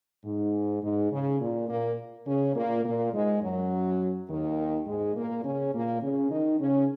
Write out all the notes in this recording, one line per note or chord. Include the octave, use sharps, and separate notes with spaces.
G#2
G#2
C#3
A#2
A#2 A#3
C#3 C#4
A#2 A#3
A#2 A#3
G#2 G#3
F#2 F#3
D#2 D#3
G#2 G#3
A#2 A#3
C#3 C#4
A#2 A#3
C#3 C#4
D#3 D#4
C#3 C#4